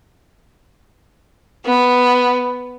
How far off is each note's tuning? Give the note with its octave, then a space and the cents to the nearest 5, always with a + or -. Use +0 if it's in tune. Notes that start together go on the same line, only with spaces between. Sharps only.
B3 +5